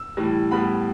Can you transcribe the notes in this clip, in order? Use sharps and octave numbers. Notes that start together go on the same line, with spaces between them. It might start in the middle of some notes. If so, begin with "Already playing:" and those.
Already playing: E6
A2 E3 G3
A2 G3 B3 B5